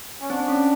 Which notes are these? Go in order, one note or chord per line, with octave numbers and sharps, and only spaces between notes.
C#4
C4 D4
C#4